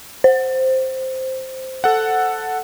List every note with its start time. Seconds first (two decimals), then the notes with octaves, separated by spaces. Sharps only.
0.24 C5
1.84 A4 F#5